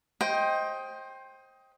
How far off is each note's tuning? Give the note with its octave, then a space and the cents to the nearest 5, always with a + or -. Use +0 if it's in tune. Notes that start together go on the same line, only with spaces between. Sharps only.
C5 +20 D#5 +20 G5 +0